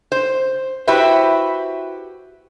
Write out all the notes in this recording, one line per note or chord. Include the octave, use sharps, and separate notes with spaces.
C5
E4 F#4 G4 B4 C5 E5